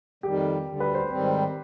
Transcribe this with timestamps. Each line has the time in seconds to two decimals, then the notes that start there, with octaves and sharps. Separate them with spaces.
0.23 F2 D#3 G3 G4
0.66 D2 D3 G3
0.80 B4
0.95 C5
1.09 G#2 D#3 G3 C4